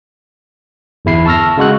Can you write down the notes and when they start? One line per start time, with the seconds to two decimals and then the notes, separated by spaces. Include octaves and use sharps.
1.05 G1 E2 E4 C7
1.26 A5 C#6 E6 F6 A#6
1.57 C#3 G#3 F#4 F#6